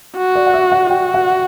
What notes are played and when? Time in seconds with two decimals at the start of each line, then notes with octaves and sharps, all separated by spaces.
0.17 F#4
0.35 D5
0.47 F#5
0.53 E5
0.72 F#5
0.90 F#4 G5
1.14 F#5